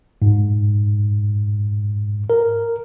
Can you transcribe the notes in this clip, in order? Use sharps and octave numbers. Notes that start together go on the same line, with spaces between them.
G#2
A#4